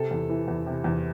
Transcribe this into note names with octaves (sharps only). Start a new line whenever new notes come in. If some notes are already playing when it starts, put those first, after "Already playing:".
Already playing: C3 A4
E2
E3
E2
C3
E2